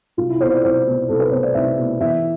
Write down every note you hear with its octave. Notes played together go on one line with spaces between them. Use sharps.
C2 F4
E4
B2 B3 C5
D5
C2 C5
B2 B3
C2 A4
B4
B2 B3 C5
D5
C2 E5
B2 B3
E2 E5